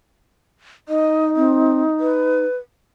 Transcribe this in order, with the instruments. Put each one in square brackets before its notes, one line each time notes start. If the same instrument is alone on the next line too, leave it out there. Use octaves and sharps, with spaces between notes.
[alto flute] D#4 [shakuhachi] D#5
[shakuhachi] C4
B4